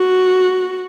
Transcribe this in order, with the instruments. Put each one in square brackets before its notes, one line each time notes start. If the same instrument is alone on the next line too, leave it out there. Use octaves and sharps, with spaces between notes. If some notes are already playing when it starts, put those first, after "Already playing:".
Already playing: [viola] F#4